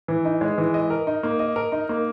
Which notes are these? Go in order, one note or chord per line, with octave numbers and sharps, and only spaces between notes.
E3
D#4
G#3
E3
D#5
A#4
D#4
A#3
D#5
A#4
D#4
A#3